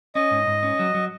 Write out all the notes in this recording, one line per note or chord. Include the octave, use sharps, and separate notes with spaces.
C#4 D#5
G#2
G#2
C#4
F#3
F#3